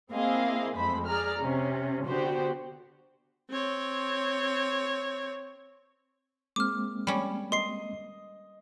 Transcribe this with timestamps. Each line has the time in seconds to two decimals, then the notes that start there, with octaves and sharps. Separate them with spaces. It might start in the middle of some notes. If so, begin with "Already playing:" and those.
0.11 A#3 C4 E4 G#4 D#5 F5
0.77 F2 G#3 A3 C5 B5
1.06 G#4 D5 A#5 F6
1.41 C3 C#4
2.06 D3 B3 F#4 G4 C5
3.50 C4 C#5
6.56 G#3 A#3 C4 D6 F6
7.07 G3 C#4 B5
7.52 D#5 C6 C7